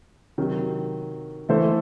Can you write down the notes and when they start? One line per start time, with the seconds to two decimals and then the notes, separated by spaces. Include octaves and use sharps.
0.38 C3 D#3 F#3
1.49 E3 A3 E4 A4 C5